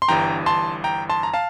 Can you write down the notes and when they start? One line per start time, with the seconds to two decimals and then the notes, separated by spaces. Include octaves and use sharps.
0.02 C6
0.08 G1 G2 E3 G5 A#5
0.46 A5 C6
0.84 G5 A#5
1.10 A5 C6
1.23 A#5
1.34 F5 A5